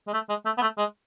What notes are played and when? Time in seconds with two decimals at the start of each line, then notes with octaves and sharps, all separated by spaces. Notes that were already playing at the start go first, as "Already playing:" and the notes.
0.07 G#3
0.14 A3
0.29 G#3
0.45 A3
0.58 B3
0.62 A3
0.78 G#3